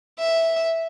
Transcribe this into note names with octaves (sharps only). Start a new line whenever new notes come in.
E5